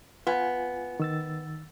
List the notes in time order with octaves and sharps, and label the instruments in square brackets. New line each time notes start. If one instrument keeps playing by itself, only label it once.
[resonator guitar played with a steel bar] B3 [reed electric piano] F4 G#5
[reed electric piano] D#3 E6 A6